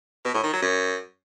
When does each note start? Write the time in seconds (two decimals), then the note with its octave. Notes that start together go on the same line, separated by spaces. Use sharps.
0.25 B2
0.34 A2
0.43 D#3
0.53 F#3
0.62 F#2